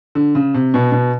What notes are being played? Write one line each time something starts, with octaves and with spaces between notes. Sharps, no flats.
D3
C#3
C3
B2
B2